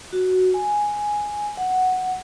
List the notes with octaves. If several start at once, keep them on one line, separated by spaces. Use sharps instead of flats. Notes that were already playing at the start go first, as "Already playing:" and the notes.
F#4
G#5
F#5